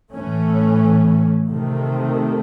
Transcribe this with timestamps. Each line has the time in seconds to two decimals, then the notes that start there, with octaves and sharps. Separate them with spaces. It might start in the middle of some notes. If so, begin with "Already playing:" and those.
0.12 A2 E3 A3 C#4
1.51 C3 D#3 A3